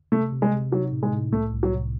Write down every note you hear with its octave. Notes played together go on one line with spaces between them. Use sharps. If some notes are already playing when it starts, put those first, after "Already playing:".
C3 A3
C3
G#3
C3
F#3 D#4
A2
G#3
A2
C2 A3
C2
F#3
C3